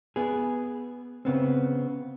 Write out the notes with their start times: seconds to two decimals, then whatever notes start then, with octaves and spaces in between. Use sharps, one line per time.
0.16 B3 G#4
1.25 C#3 B3 C4